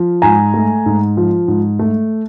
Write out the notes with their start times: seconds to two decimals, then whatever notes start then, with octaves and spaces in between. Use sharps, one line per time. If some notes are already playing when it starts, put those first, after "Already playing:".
Already playing: F3
0.22 G#2 G#5 A#5
0.54 A3
0.86 G#2
1.17 F3
1.48 G#2
1.79 A3